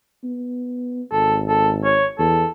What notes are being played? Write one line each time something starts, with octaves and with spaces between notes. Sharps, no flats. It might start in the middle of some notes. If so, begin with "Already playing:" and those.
B3
G#1 A4
A4
C#5
E2 A4